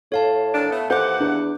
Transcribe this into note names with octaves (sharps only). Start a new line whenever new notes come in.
A2 A4 C#5 F5 A5
D#3 E3 D4
A3 B3
D#2 E3 A4 C5 F#5 D6 F#6 G6
E2 D4